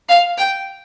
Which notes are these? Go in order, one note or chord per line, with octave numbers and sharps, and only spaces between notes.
F5
G5